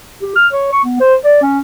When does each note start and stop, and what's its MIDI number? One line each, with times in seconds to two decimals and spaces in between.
0.22 0.31 67
0.36 0.47 89
0.53 0.68 73
0.72 0.81 85
0.84 0.98 59
1.01 1.15 72
1.24 1.39 74
1.42 1.60 61